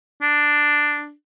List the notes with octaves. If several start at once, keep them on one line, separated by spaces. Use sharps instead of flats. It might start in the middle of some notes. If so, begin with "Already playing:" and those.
D4